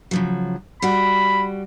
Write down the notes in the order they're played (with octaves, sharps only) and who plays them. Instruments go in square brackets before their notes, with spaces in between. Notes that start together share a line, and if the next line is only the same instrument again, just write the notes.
[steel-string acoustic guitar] C#3 F3 F#3
[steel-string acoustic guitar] G3 F#4 [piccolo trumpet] B5